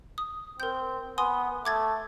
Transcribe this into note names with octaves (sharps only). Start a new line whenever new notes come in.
D#6
C4 A#4 G6
B3 G#5 C6 D#6
A3 D6 G#6 A6